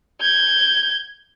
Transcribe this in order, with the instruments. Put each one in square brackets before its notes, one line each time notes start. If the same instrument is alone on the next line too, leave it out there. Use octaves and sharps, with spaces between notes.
[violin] G6 G#6